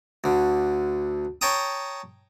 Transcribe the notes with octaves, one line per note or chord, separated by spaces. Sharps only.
D2 D3
C#5 G5 A5 A#5 D#6